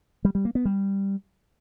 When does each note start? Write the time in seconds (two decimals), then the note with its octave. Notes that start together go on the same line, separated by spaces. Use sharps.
0.25 G3
0.35 G3
0.45 A#3
0.55 B3
0.65 G3